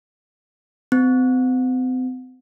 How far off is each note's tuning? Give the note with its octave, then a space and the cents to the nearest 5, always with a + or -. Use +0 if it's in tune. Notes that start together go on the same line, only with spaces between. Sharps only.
C4 -40